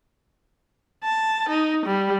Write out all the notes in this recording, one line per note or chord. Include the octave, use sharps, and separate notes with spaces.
A5
D#4
G3